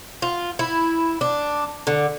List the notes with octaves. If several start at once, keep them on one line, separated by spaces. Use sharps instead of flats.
F4
E4
D4
D3